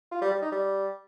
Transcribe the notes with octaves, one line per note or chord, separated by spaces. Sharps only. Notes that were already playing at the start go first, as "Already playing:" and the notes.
F4
G3
G3
D#4
G3